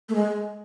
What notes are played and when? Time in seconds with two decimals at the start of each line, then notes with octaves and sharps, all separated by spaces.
0.09 A3
0.15 G#3